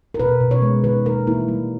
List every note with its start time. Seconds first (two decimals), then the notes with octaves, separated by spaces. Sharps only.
0.14 A#4
0.20 B2 B4
0.40 B2
0.51 C#5
0.62 G#3
0.84 D#3 B4
1.05 A#3 A#4
1.27 A#3 E4
1.48 G3